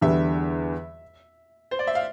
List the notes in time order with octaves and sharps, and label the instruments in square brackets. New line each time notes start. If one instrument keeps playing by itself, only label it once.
[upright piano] E2 D3 G3 B3 [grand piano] E5
[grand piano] C5
D5
E5
F5